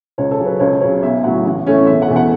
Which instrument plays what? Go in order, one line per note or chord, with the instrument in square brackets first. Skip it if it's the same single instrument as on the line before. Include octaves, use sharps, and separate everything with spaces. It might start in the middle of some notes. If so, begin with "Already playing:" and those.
[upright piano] C#2 C#5
A4
C#3 F#3
B4
C#2 C#5
C#3 F#3 C#4 C#5
B1 E5
A2 F#3 F#5
A1
A2 A3 C#4
E1 E5
F#5
E2 B2 A3
F#5